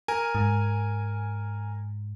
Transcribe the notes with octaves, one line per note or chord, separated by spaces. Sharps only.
A#4 G#5
G#2